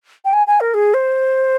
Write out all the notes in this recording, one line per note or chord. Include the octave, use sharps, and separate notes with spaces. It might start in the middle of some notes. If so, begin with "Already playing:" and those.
G5
G#5
G#5
A#4
G#4
C5